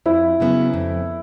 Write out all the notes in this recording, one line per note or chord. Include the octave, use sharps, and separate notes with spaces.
F2 E4
C#3 F#3 B3
F2